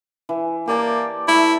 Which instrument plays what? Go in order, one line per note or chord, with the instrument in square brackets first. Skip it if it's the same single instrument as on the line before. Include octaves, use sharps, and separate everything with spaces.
[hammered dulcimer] E3
[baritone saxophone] A#3 [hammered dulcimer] G4 D5 A5
[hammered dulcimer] A3 [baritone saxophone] E4